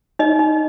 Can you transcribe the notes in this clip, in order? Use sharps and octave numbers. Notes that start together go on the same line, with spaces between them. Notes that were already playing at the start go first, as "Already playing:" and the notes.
D#4 D#5
D#4